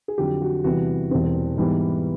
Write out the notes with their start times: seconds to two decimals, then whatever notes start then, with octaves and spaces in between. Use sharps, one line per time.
0.08 G#4
0.18 F2 D3 F#3 G4
0.42 F#4
0.64 E2 C3 E3 G3 F#4
1.11 E1 E2 B2 G3 C4
1.57 G#2 E3 G3 B3